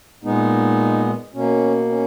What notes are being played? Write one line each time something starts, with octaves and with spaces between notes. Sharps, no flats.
A#2 G#3 B3 D#4
B2 A#3 C#4
C#4